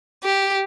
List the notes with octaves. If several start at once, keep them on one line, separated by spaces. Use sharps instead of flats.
G4